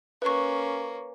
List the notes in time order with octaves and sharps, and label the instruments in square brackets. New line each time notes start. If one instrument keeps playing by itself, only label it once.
[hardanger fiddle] A#3 C#4 [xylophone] B4 C#6